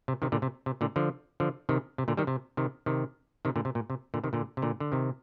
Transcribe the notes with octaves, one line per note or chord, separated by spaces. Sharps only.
C3
C3 D#3
A#2 D3
C3
C3
A#2 D3
D3 F3
D3 F3
C3 D#3
C3
A#2 D3
D#3 G3
C3
C3 D#3
C3 D#3
C3 D#3
A#2 D3
C3
A#2
C3
A#2 D3
C3 D#3
A#2 D3
C3
A#2 D3
D3
C3 D#3